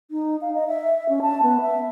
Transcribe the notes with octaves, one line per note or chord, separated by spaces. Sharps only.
D#4
F5
D#5
E5
C#4
A5
B3
E5